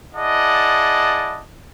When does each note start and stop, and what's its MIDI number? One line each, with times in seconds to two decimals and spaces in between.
0.14 1.42 64
0.14 1.42 68
0.14 1.42 74
0.14 1.42 75
0.14 1.42 78
0.14 1.42 81